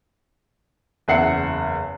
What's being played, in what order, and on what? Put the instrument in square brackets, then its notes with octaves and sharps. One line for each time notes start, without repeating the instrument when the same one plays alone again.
[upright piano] F#1 E2 E5 F#5 C7 C#7